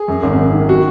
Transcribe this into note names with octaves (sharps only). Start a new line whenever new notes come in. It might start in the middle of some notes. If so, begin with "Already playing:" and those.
Already playing: G#4
F#2
G#1
G#1
D#3
F#4